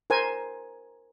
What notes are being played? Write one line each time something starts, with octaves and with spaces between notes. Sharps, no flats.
A#4 C5 G#5